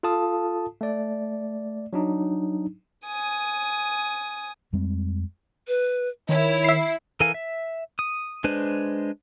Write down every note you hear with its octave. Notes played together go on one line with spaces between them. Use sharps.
F4 A4 F5 A5 D#6
A3 D5
F#3 D4 D#4
G#5 D#6
F2 G3 G#3 C4
B4
D#3 E4 C#5
E5 C7
E3 A4 A#4 F5 G#5
E5
D#6
G#3 D4 B4 C5